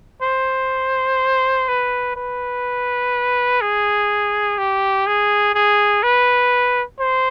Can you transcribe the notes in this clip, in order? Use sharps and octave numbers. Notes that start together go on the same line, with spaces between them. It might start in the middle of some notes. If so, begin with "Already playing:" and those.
C5
B4
B4
G#4
G4
G#4
G#4
B4
C5